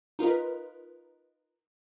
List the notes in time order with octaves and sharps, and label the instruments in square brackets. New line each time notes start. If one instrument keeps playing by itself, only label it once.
[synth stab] D#4 F4 A#4 B4